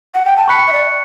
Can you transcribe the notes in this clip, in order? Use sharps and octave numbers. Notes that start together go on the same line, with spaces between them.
F#5
G5
A5
B5 C#6 F#6 C#7
E5
D5